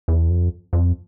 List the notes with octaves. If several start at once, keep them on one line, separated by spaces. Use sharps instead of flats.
E2
F2
F2